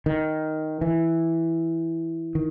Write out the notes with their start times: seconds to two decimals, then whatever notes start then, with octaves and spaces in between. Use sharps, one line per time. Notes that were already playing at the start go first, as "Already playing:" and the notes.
0.06 D#3
0.81 E3
2.35 D#3